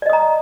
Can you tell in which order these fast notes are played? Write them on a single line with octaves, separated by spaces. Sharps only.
D5 D#5 D#6 A#5